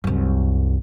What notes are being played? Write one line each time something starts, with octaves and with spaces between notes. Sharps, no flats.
C2 F#2